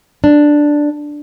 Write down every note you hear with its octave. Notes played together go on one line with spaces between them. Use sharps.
D4